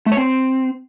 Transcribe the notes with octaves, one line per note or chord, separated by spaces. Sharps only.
A3
C#5
C4